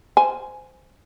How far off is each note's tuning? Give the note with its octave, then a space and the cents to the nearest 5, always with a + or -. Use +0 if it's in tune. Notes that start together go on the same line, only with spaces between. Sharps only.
C5 -20 G#5 +0